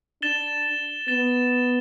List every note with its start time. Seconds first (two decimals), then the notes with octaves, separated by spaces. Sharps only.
0.22 D4 A6 E7 G7
1.08 B3 A6 E7 G7